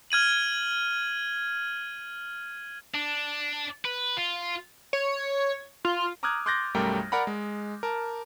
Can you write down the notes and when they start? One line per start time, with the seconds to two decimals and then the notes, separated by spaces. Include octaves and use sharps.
0.10 F6 G#6 D#7 F#7
2.94 D4
3.85 B4
4.17 F4
4.93 C#5
5.85 F4
6.23 A#5 D6 D#6 F6 F#6 G#6
6.46 C6 D6 F#6 G6 A6 A#6
6.74 B1 F#2 G3 A3 A#4 G5
7.12 A#4 D5 F#5 A#5 B5
7.27 G#3
7.83 A#4 A5